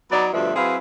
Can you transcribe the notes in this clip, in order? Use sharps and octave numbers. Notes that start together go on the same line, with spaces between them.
F#3 B3 D#4 D5
D2 G2 B2 F3 D4 E5
F#3 C4 E4 G#4 B4 F5